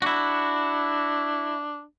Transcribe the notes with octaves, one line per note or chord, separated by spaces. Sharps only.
D4 E4 F#4